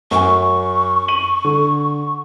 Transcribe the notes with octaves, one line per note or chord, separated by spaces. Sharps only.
F#2 G#5 C#6
D#7 F#7
D3